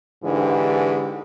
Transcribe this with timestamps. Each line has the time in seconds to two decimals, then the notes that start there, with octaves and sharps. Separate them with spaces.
0.23 G#2 D3 E3 G4